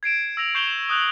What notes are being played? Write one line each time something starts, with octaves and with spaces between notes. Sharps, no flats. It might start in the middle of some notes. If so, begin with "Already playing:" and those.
G#6 C7 D7 E7
E6 A#6 F7 F#7
C#6 G6 C7 E7 F7 G7
E7
D#6 F#6 G6 F#7